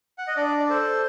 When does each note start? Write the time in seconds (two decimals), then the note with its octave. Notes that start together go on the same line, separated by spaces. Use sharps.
0.18 F#5
0.27 D#5
0.36 D4 D5
0.59 D5
0.69 A4 C5